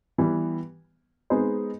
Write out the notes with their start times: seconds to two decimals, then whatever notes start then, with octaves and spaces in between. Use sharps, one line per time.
0.18 E3 G3 B3
1.30 G#3 B3 D#4 G#4 C5